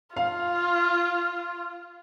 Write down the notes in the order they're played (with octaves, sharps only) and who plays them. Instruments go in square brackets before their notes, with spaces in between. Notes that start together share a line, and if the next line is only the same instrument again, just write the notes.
[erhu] F4 [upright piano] F5